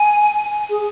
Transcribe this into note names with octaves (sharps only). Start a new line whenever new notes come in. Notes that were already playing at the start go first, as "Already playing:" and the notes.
Already playing: G#5
G#4